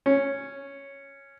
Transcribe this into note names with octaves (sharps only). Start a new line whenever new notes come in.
C#4